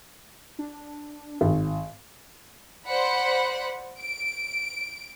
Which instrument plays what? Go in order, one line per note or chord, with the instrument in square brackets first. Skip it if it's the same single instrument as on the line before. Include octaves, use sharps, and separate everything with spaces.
[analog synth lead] D4
[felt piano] G#1
[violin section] C5 D5 F#5 B5
D7